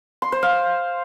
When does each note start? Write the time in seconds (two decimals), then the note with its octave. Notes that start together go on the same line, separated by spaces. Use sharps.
0.22 C6
0.32 C5
0.43 F5